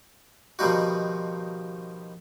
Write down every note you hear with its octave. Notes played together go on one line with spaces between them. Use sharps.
B2 D#3 F3 G3 D#4 F#4